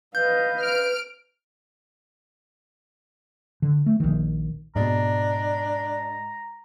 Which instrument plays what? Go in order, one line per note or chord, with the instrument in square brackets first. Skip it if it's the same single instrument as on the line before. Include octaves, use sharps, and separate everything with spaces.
[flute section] B4 [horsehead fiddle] D#5 F5 [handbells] G6
[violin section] F6 D7
[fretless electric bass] D3
A3
A#1 D#3
[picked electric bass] G#2 B2 [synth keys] G#3 D#5 A6 [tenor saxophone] D4 [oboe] A#5